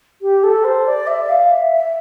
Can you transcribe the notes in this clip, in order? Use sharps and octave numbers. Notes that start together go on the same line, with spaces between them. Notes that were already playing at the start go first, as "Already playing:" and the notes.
G4
A4
C5
D5
E5
F5
E5
E5